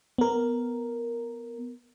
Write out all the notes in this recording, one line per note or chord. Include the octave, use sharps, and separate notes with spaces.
B3 A#4